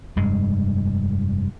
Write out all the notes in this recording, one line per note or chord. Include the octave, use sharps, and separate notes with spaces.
F1 G2 G#3